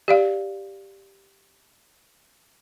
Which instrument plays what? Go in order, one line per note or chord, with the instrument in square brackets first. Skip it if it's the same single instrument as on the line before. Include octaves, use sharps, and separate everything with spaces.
[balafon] G4 D5 F5